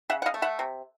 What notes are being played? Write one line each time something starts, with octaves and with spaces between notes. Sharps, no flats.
C#3 E5 F#5
F#5
D#5 F5
A3
E5 F#5
C3